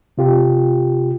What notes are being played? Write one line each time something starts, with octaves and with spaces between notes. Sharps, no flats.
C3 F4 G4